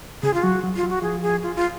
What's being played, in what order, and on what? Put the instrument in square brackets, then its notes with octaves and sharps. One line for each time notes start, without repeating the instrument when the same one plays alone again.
[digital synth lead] C#3 [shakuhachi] G#4
[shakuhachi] F4
[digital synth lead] F#3 [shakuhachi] F#4
[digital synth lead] F#3
[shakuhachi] F4
[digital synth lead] F#3
[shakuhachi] F#4
[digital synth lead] F3 [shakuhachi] G#4
[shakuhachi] G#4
F4
F4